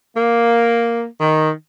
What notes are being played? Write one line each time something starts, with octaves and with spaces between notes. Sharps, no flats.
A#3
D#3